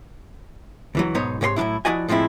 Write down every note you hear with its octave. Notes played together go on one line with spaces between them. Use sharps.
C#2 E3 F#3
B1 G#2 B3 D#4 C5 C#5
G#2 C3 C#5 D#5 C6
A2 F#3 G#3 D4 E4
F3 E4 F#4 D5 D#5 G#5
A2 F3 G#3 C4 E4